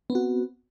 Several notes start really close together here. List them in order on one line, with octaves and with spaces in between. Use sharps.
B3 C4 F#4